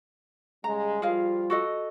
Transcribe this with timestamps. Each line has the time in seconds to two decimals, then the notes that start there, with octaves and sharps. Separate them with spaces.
0.64 C#3 G3 G#3 A#5
1.02 F3 G3 F4 G#4 A#4 F5
1.50 F#4 A4 D#5